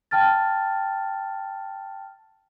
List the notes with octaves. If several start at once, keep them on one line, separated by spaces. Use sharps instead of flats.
G5 A5 F6 A6